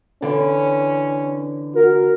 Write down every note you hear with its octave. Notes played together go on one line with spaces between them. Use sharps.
D3 E3 C#4
F#4 A#4